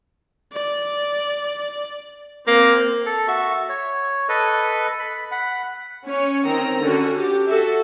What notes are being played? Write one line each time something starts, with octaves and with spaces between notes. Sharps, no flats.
D5
A#3 C4
A4
F#4 E5 C#6
C#5
A4 B4 D#5
B5
F#5 B5
C#4 C#5
D#3 C4 A#5
D3 C#4 F#4
G4
F#4 A4 E5